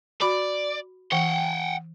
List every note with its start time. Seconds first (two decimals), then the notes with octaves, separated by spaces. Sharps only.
0.21 F#4 D5 B5 D6
1.12 E3 F#5 G5